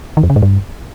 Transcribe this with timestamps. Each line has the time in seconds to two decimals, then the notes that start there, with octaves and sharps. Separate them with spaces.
0.17 D#3
0.23 F2
0.30 C#3
0.36 G#2
0.42 G2